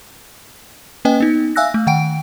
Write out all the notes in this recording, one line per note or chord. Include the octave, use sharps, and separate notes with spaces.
A#3 C#4 B4 D#5 G5 G#5
B3 D#4
E5 F5 G#5 E6 F#6 A#6
A3
D#3 F#5 G5 D7